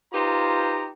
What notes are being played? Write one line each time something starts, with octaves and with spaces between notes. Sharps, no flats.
D#4 F4 G4 B4 C5 A#5